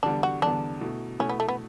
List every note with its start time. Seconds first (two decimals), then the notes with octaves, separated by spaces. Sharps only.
0.03 E2 D3 G3 B3 D4
0.23 F#4
0.42 E2 D3 G3 B3 D4
0.81 B2 A3 E4
1.19 B2 A3 C#4 E4
1.29 B3
1.40 A3
1.48 B3